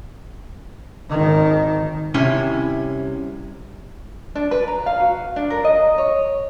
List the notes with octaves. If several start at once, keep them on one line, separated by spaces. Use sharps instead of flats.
G#1 D#3
C2 C3 C#4 E4
D4
B4
A#5
F5
F#4
D4
A#4
D#5
C#5